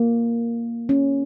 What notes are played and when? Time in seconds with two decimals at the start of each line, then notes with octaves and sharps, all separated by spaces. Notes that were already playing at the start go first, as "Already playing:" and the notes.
Already playing: A#3
0.89 C#4